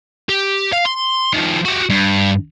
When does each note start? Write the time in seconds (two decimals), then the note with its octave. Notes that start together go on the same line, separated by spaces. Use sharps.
0.29 G4
0.72 F5
0.85 C6
1.33 D#3 F3
1.65 F#4 G4
1.90 G2